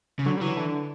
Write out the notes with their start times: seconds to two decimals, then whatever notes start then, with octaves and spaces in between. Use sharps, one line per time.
0.19 C#3
0.26 D3 F#3
0.37 G3
0.41 E3 F#3
0.57 D3